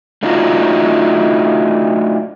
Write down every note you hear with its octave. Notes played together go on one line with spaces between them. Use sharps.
A3 D4 D#4 F4 F#4